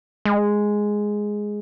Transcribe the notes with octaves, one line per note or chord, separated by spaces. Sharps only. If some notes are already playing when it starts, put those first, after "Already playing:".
G#3